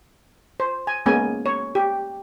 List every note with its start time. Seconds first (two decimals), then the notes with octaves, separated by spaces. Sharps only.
0.60 C5
0.87 G#5
1.06 G#3 A#3 B3 C#4 G#5
1.46 C#5
1.75 G4